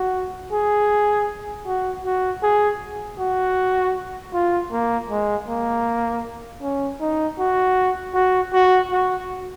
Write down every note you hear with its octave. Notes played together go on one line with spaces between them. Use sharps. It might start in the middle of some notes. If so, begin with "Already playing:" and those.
Already playing: F#4
G#4
F#4
F#4
G#4
F#4
F4
A#3
G#3
A#3
C#4
D#4
F#4
F#4
F#4
F#4